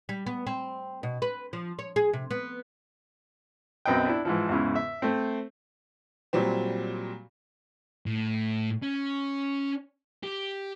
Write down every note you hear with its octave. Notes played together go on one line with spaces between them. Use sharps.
G3
B3
C4
B2
B4
F3
C#5
G#4
C3
B3
B1 F#2 C4 B4 D#5 G5
D4 E4
G#2 E3 F3
E2 G#2 C#3 E4
E5
A3 C4
A#2 F#3 G3 C4
A2
C#4
G4